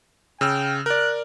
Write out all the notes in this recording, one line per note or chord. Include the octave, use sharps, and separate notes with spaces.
C#3 G5 E6 F6
A#4 D5 F#6